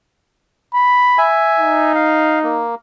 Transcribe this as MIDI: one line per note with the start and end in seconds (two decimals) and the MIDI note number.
0.74 1.27 83
1.18 1.92 76
1.18 1.92 80
1.60 2.65 63
1.95 2.39 77
2.43 2.75 58